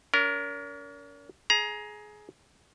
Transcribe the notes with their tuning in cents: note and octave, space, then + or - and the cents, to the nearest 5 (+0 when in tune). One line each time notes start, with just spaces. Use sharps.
C#4 +45 A#4 +0
G#4 +15 A#5 +20